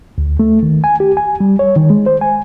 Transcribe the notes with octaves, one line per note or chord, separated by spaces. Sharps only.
D2
A3
D#3
G#5
G4
G#5
G3
C#5
D#3
G#3
C5
G#5